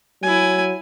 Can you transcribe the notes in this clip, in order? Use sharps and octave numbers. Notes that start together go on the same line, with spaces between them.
F#3 E4 G#5